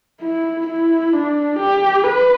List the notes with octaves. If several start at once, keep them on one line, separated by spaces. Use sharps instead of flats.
E4
E4
D4
G4
B4